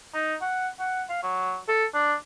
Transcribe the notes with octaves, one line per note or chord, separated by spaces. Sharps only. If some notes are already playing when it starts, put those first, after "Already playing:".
D#4
F#5
F#5
F5
F#3
A4
D4